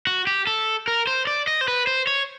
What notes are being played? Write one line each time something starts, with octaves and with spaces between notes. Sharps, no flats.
F#4
G4
A4
A#4
C5
D5
D#5
C5
B4
C5
C#5